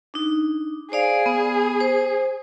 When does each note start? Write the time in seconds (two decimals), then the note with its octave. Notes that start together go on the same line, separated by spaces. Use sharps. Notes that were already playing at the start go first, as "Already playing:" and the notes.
0.14 D4 D#4
0.92 G#4 C5 D5 F5
1.26 B3
1.80 C5